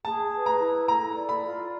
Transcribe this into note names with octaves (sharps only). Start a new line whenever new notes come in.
G#4 A5
B4
A#5
E4
A4 A#5
D5
B5
F4